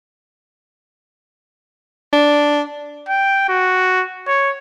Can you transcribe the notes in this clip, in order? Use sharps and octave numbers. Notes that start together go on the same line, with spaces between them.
D4
G5
F#4
C#5